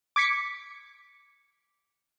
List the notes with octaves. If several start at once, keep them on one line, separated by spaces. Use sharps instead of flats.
D6 G#6 B6 C#7